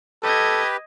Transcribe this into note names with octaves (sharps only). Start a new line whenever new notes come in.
G4 A4 B4 D#5 G#6